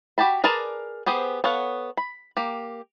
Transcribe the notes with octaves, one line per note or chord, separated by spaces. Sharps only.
F#4 G4 G5 A5 B5
G#4 A#4 B4 D5 A5
B3 G4 G#4 C5
B3 A4 C#5 F5 F#5
B5
A#3 G4